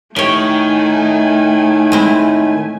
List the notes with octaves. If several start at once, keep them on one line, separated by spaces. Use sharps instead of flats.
A2 D#3 A3 G4 C#5 G#5
G#3 C4 E4